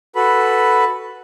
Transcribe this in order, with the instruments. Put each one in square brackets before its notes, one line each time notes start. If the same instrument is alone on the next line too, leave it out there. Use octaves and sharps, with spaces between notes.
[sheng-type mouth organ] F#4 A4 B4 B5